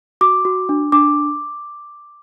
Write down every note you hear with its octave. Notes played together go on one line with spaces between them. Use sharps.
F#4 D6
F#4
D4
D4 D6